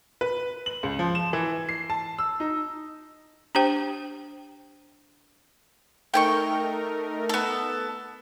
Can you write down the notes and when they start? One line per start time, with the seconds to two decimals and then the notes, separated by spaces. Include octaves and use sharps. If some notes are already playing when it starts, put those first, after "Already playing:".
0.21 B4
0.66 F#7
0.83 C#2
0.99 F3
1.15 E7
1.33 E3
1.69 C7
1.90 A5
2.18 E6
2.40 D#4
3.55 D4 G4 C5 G5
6.14 A3 D#4 A#4 G5 G#5 C#6
7.29 B3 A4